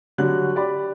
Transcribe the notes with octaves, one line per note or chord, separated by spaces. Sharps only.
D3 F#3 G3 F#4 F#6
G4 D5 B5